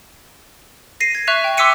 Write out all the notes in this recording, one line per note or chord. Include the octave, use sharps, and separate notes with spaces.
A#6 C7 D#7
G#6
E5 C#6 F#6 E7 F7
G5
C6 D6 E6 B6 C#7 D#7